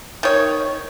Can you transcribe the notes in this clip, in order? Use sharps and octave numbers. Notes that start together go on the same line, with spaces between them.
D#3 C#5